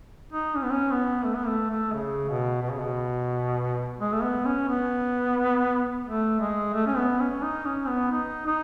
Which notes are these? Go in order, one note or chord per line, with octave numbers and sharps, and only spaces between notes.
D#4
C#4
B3
C#4
B3
A3
B3
A3
A3
C#3
B2
B2
C#3
B2
G#3
A3
B3
C#4
B3
A3
G#3
A3
C#4
B3
C#4
D#4
C#4
B3
D#4
D#4